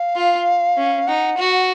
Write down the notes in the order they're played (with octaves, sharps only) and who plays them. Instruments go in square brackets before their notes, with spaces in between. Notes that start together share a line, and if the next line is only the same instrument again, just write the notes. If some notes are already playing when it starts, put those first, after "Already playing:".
Already playing: [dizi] F5
[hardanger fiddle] F4
C#4
[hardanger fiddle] D#4 [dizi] F#5
[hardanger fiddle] F#4